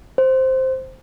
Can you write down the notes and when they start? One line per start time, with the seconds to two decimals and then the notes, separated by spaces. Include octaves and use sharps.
0.18 C5